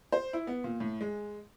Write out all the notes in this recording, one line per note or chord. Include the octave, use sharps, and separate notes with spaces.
C5
E4
B3
A#2
A2
G#3